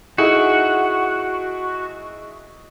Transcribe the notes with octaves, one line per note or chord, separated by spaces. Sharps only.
D#4 E4 F#4 G#4